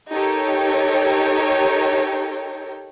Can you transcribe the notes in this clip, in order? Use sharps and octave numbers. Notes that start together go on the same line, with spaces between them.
D#4 G4 A4 A#4 C#5 G5